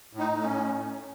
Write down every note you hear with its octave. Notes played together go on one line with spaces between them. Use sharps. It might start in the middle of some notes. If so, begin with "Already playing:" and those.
A2
D#4
A2
C#4
A2